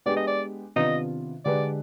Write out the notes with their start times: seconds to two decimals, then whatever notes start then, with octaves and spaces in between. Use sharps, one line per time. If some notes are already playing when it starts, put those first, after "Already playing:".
0.06 G#3 B3 D4 G4 D5
0.16 D#5
0.27 D5
0.76 C3 D#3 B3 D4 F4 D#5
1.45 D3 G#3 D4 G4 B4 D5